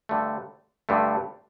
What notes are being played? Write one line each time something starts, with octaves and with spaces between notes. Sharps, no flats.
G2 D3 A3
G2 D3 A3